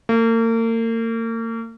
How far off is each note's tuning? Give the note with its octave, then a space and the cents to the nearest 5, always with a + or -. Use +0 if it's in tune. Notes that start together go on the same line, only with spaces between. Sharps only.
A#3 -40